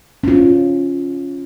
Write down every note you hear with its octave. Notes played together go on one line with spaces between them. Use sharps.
C#4 F4